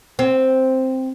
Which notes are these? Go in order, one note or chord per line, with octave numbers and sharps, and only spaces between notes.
C4